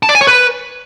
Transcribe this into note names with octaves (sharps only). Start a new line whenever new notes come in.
A5
D5
G#5
C#5
B4